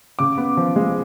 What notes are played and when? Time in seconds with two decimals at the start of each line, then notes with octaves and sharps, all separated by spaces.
0.19 C#3 D6
0.38 B3
0.57 F3
0.76 G#3